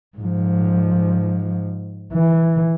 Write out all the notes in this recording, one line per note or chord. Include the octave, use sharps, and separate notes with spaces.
G#2 F3
E3